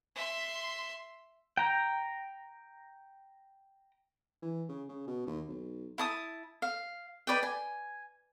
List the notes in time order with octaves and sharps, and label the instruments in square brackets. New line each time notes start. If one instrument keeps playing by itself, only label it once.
[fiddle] E5 C6
[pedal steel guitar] G5 A#5
[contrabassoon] E3
C#3
C#3
B2
D#2
B1
[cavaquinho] E4 A5 D#6
F5
B4 D5 D#5 G5
G#5